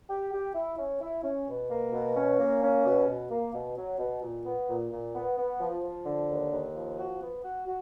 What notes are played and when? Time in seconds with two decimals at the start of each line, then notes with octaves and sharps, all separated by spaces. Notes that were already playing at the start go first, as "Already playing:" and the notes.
0.08 G4
0.32 G4
0.53 E4
0.77 C#4
1.00 E4
1.23 C#4
1.46 B2
1.69 A#3
1.92 B2
2.15 C#4
2.38 A#3
2.61 C#4
2.84 B2
3.06 B2
3.30 A#3
3.53 B2
3.76 F#3
3.98 B2
4.21 A#2
4.45 B3
4.68 A#2
4.91 A#2
5.14 B3
5.37 B3
5.59 F3
5.83 F3
6.05 D3
6.28 D#2
6.51 D#2
6.74 F3
6.98 F#4
7.21 B3
7.43 F#4
7.66 F#4